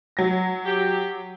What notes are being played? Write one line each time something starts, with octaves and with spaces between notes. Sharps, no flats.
F#3 A#6
G4